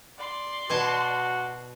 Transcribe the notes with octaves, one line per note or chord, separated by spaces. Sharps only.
D5 C6
B2 F#4 G#5 A5